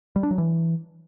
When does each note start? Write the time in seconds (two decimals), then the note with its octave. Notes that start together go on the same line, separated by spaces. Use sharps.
0.16 G3
0.23 D4
0.31 F#3
0.38 E3